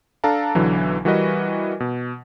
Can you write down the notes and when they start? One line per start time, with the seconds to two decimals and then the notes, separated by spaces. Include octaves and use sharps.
0.24 D4 A4 F5 A5 A#5
0.55 B1 D3 E3 F#3
1.05 E3 G3 F#4 A#4 B4 D#5
1.80 B2